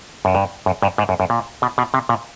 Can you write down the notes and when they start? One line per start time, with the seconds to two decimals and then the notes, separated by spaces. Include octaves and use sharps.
0.25 F#2
0.35 G2
0.66 F#2
0.82 G2
0.98 G#2
1.09 F#2
1.20 F#2
1.30 A#2
1.62 B2
1.78 B2
1.94 C3
2.09 A#2